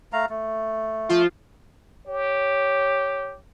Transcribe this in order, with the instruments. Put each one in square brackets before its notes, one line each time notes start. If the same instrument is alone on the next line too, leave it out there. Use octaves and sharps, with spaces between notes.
[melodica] A3 F5 A#5
A3
[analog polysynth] F3 F4
[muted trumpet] G4 [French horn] C#5